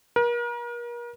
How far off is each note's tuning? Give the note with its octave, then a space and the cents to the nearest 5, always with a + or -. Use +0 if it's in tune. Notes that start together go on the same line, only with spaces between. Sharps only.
A#4 +40